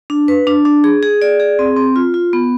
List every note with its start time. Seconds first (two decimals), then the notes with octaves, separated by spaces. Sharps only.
0.10 D4
0.28 B4
0.47 D4
0.65 D4
0.84 G#4
1.03 G#4
1.22 D5
1.40 G#4
1.59 C4
1.76 C4
1.96 F4
2.14 F4
2.33 B3